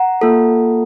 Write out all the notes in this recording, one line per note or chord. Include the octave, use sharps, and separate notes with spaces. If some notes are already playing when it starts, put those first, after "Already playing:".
Already playing: F#5 A#5
A#3 F4 A4